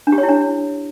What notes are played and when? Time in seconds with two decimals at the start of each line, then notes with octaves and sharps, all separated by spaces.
0.07 D4
0.12 G4
0.18 C#5
0.23 E4
0.29 D4